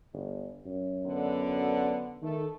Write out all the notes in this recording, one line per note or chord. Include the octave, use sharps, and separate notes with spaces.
G1
F#2
D3 B3
D#3 A3 A4